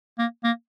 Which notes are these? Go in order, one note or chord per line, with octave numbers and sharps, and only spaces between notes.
A#3
A#3